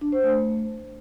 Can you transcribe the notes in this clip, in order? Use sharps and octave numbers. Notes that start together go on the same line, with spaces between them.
D4
C5
A3